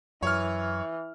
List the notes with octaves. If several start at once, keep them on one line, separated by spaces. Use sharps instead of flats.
F#2 E3 C#5 F6